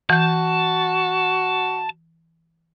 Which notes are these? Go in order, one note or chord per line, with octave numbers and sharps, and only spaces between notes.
E3 F#4 A5 G6